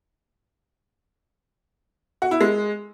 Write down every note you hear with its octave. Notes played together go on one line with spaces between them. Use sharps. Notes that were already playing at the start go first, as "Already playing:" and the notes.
F#4
E4
G#3